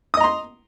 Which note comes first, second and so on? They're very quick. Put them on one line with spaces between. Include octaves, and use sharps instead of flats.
D#6 D#5 A#5 C6